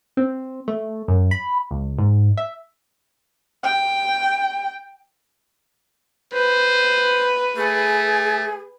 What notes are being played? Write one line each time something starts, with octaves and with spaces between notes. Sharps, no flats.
C4
A3
F#2
B5
C#2
G#2
E5
G5
B4 C5
A3 G#4